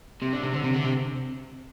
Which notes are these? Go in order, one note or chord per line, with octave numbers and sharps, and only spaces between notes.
C3
D3
C3
D3
C3
D3
C3